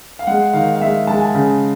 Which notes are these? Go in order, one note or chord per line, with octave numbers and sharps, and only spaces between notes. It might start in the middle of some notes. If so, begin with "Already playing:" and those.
F5
G#3 F#5
D#3 F5
F5
G#3 E5
G#3 A5
G#5
A5
C#3